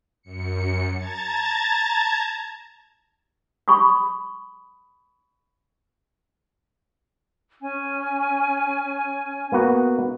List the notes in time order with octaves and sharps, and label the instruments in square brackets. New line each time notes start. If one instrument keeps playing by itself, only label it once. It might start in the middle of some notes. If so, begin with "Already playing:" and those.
[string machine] F#2 C#7
A5 A#5 G#6 A6
[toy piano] B5 C#6 D#6
[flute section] C#4 G#5
[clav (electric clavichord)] A#3 B3 F#4